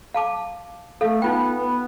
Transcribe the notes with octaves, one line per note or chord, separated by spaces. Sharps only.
F5 A5 D6
A3 A4 F5
B3 D#4 F4 G5
B3